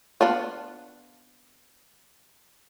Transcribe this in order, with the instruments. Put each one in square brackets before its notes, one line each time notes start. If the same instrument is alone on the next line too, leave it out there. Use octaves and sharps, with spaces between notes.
[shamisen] B3 D4 F4